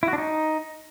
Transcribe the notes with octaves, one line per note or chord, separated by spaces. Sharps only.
E4
F#4
D4
D#4